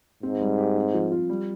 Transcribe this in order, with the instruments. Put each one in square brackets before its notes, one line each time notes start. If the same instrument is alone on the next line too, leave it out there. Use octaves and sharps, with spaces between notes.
[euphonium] G#2 [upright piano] C4
[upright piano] G3
G4
C4
F3
F4
G3